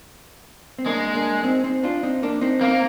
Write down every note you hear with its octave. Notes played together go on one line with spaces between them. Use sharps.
C4
G#3 A#3 D4
A#3 D4
C4 D#4
C4 D#4
D4 F4
C4 D#4
A#3 D4
C4 D#4
A#3 C4 D#4